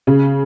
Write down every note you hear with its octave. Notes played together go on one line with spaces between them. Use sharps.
C#3